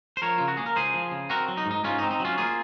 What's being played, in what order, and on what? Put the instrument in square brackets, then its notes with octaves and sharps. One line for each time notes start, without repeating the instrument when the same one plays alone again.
[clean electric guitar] C5
F3 A#4 C#5
C#3 F4
F#4
A#3 G#4
A#4
C#2 G#4 C5
F3
C#3
C4 F#4 A#4
F#3
D#4
G#2
D#4
G#2 C#4 F4
D#4
C4
D#4
F#3 C#4 F4
A#3 F4 G#4